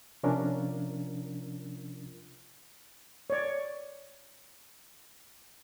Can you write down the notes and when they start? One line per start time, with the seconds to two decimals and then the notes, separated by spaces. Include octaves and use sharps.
0.23 C3 F3 C#4 D4 F4 A#4
3.30 C#5 D5